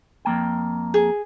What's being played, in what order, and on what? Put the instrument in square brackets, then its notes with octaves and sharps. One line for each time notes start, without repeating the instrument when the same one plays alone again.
[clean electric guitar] F2 A#3 G5
[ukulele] G#4